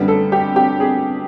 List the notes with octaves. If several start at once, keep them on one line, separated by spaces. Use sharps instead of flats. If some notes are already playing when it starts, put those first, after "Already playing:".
Already playing: F#2 D3 G3 B3
A4
G4
G4
G#4